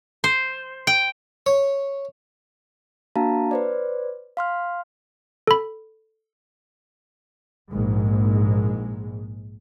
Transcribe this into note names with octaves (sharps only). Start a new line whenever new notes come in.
C5
G5
C#5
A#3 D4 F#4 F5 A5 A#5
B4 C5 D5
F5 C6 F6
A4 B5
A#1 G#2 G#3